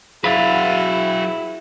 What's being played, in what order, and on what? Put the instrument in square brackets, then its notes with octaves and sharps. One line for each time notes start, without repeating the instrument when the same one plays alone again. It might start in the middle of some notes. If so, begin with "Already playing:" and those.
[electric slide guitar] F#3 B4 [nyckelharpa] E4 [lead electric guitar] F#4 F5 [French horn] G#4